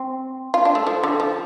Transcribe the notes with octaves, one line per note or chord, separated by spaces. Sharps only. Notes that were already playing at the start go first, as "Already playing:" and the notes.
Already playing: C4
F4
D4
A3
F3
D3
F3